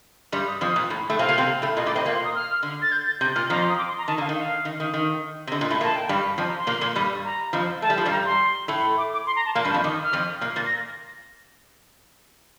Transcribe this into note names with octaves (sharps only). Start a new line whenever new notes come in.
G2 G3 C6
D#6
F2 F3 D#6
A#2
A2
A2 A3
C3 C4 F5
A#2 A#3
C3 C4
A2 A3
A#2 A#3 D#5
A2 A3 D6
C3 C4 D#5
A#2 A#3 F5
C6
D#6
F6
D3
A6
G6
A6
C3 G6
A#2 F6
F2 F3 A#5
C6
D#6
D6
C6
A#5
D#3 A5
D3 F5
D#3
F5
D#3
D#3
D#3
C3
D3 D#5
A#2
A2 A3
A#2 A#3 A5
G5
G2 G3 F5
F2 F3 A5
A#5
C6
A#2 A#3
A#2 A#3
G2 G3
A#5
F2 F3
A3 A5
G3
F3
G2 G3
A#5
C6
A2 A3
D6
D6
C6
A#5
A5
A#2 A#3 F5
G2 G3
A5
F2 F3
D#3 D6
D#6
F6
F2 F3
A#2 A#3 F6
A#2 A#3 A6
A#6